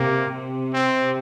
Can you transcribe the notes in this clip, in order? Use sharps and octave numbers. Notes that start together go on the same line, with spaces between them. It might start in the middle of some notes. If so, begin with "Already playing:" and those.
Already playing: C3 A#3
C3
C4